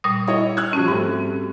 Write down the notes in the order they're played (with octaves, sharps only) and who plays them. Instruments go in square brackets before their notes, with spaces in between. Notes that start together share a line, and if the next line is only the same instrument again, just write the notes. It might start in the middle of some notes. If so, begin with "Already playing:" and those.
[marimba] A#2 G3 D#6
[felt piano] E4 C#5 D#5
E6 F#6 G#6
[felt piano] F3 A5 [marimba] C#4 F#4
[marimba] G#2 [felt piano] G3 A3 C4